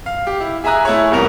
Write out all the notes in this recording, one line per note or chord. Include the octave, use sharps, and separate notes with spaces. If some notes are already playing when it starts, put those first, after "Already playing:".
F5
G4
E4
G#4 E5 G#5 A#5 D#6 F#6
A3 E4 G#4 C#5
C2 F2 G3 B3 A#4 F7